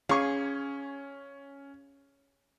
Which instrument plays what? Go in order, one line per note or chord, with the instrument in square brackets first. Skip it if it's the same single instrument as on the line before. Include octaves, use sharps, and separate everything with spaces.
[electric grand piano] C#4 [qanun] G#4 [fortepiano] F5 C#6